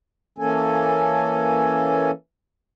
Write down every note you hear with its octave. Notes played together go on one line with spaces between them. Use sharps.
E3 A#3 C#4 A4 G#5